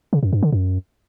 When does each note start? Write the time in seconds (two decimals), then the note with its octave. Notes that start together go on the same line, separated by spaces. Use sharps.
0.13 C#3
0.23 F#2
0.33 G2
0.43 D3
0.53 F#2